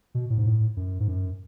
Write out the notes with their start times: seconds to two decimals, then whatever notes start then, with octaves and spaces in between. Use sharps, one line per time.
0.15 B2
0.30 A2
0.38 G#2
0.46 A2
0.77 F#2
1.00 G#2
1.08 F#2